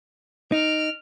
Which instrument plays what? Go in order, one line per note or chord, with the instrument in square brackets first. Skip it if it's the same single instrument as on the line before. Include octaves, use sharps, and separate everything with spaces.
[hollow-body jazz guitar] D#4 [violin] F6 D7